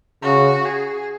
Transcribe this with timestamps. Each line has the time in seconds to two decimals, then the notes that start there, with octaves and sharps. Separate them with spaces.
0.23 C#3 F#4
0.65 G#4